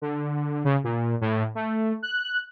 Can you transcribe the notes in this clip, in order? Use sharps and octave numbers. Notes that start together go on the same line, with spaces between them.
D3
C#3
A#2
A2
A3
F#6